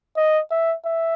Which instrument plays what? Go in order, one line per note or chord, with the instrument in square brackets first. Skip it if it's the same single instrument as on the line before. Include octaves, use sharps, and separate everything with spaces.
[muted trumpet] D#5
E5
E5